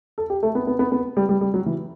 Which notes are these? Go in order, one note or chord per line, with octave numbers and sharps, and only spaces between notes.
A4
G4
A3
B3
B3
B3
B3
G3
G3
G3
F#3
E3